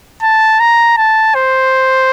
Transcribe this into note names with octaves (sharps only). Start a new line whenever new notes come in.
A5
A#5
A5
C5